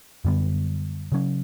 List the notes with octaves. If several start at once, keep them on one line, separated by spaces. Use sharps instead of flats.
F#2 D3 G3 B3
C#3 F#3 C#4